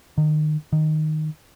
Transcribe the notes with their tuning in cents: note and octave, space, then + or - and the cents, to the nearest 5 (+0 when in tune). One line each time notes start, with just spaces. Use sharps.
D#3 -30
D#3 -5